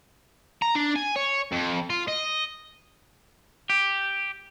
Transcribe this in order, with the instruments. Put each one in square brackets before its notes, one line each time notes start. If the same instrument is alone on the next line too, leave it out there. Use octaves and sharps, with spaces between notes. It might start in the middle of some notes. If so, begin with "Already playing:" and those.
[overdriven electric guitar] A#5
D4
G#5
C#5
F2
F4
D#5
[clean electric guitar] G4